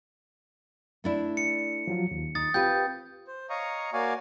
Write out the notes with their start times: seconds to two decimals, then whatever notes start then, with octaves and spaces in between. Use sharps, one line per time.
1.04 A3 D4 E4
1.37 C#7
1.87 F3 F#3 F4
2.11 D#2
2.35 D#4 D#6 A6
2.54 C4 F4 G4 B4 G5 G6
3.27 C5
3.50 C#5 D#5 F5 A#5 C#6 D#6
3.93 A#3 F#4 C#5 D5 F5 G#5